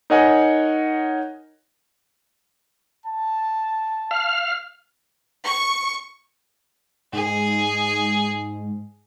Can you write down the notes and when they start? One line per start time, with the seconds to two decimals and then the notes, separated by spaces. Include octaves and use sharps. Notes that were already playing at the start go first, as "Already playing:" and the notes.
0.10 D#4 A#4 C#5 D#5 F#5 G#5
3.06 A5
4.11 F5 F6
5.44 C#6
7.13 G#2 G#4